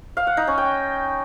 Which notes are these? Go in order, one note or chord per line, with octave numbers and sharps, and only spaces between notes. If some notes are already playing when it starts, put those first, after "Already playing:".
F5
F#5
D#4
C#4
G5